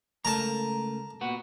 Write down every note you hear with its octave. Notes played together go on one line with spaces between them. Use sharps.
C#2 A3 A#4 A5 A#5
A#2 B3 F#4